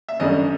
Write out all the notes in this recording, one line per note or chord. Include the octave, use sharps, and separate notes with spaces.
E5
G#1 F#2 D3 G3 D#5